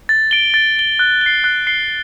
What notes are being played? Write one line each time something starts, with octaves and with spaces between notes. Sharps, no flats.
A6
D7 G7
A6
D7 G7
F#6
C7 G7
F#6
C7 G7